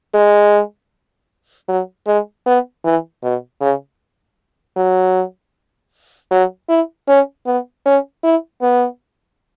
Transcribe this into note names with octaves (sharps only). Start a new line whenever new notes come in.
G#3
F#3
G#3
B3
E3
B2
C#3
F#3
F#3
E4
C#4
B3
C#4
E4
B3